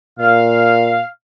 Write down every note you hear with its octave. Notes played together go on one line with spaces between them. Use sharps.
A#2 F5